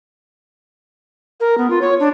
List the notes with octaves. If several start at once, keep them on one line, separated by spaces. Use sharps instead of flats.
A#4
B3
F4
C#5
D4